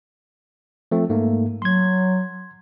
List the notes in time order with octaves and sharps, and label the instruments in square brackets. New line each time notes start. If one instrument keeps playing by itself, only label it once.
[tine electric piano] F3 A3 C4
G#2 A3 A#3
[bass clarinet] F#3 [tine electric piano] C6 G#6